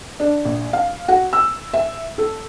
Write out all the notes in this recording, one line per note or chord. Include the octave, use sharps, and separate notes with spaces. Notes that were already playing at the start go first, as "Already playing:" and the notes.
D4
A#1
F5
F#4
E6
E5
A4